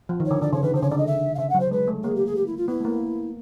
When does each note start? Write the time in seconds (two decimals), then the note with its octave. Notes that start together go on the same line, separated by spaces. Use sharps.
0.09 F3
0.20 D#3
0.25 C#5
0.31 D3
0.42 D3 D5
0.53 C#3 C#5
0.63 D#3 B4
0.74 D3 C5
0.82 C#3 C#5
0.90 D3 D5
0.98 D#5
1.07 E5
1.35 F5
1.38 C#3 E5
1.49 F#5
1.54 F#3
1.60 C5
1.71 G#3 B4
1.87 A3
2.03 A#3 G#4
2.15 G4
2.26 G#4
2.35 G4
2.46 E4
2.57 F4
2.68 B3 E4
2.80 A3
2.85 A#3